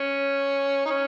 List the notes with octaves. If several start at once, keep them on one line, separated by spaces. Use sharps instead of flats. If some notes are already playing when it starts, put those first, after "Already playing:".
Already playing: C#4
D#4
C#4